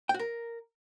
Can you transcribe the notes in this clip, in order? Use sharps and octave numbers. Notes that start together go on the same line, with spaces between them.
G5
F#4
A#4